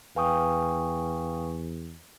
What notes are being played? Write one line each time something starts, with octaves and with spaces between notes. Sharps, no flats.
E2 B4 F5 G5 G#5 C#6 D#6